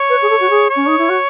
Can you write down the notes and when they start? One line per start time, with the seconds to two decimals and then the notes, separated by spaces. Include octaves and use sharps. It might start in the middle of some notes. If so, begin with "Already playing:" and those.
Already playing: C#5
0.09 B4
0.22 G#4
0.29 A4
0.40 F#4
0.50 G#4
0.70 C#5
0.76 C#4
0.87 D#4
0.98 E4
1.09 F#4